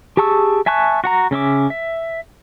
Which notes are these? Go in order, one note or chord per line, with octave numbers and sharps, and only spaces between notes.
G4 G#4 A5 C#6 E6
E5 G#5 A5 C#6 F#6
F#4 F#5 A#5
C#3 C#4 E5 D6
E5